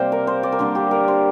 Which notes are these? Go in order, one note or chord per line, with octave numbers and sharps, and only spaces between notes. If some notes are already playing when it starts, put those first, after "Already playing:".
Already playing: C3 G3 A#3 C5 F5 G5
A#4
C5
D5
A#4
D3 G3 A#3 D4 C5
G4
A#4
C5